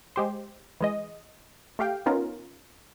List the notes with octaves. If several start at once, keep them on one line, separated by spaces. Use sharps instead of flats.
G#3 G4 C5
E3 G#3 D#5
A3 G4 F5 G5
B3 C#4 D#4 F4 A#4